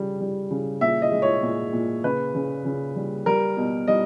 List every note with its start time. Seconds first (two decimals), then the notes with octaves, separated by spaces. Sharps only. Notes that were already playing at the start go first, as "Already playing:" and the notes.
Already playing: C#3 G3
0.20 G3
0.51 C#3
0.81 A#2 E5
1.02 D#5
1.12 G#3
1.22 C#5
1.43 A#2
1.73 A#2
2.04 C#3 B4
2.35 C#3
2.65 C#3
2.96 G3
3.26 G3 A#4
3.57 B2
3.88 G3 D#5